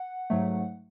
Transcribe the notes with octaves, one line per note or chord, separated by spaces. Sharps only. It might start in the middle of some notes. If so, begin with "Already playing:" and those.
Already playing: F#5
G#2 F#3 A3